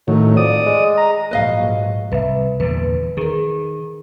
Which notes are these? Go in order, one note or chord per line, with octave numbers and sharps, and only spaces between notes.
A2 D#3 F#3
F2 D5 D#6
G#3
A#5
A#1 G#2 F#3 B4 D#5 F5
C2 B4 E5
E2 A#2 D3 B4
D#3 G#4 A#4